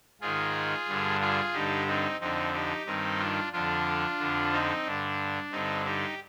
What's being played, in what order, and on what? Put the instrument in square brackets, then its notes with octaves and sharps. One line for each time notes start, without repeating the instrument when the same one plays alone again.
[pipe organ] G#2 D#3 F4 G#4
G2 D3
F4 G#4
G2 D3 D#4 G4
C4 D#4
F2 D3 C4 D#4
D#4 G4
G2 D#3 C4 D#4
D4 F4
F2 D3 D4 F4
F2 D3
C4 D#4
G2 D3 D4
G2 D3 C4 D#4
D#4 G4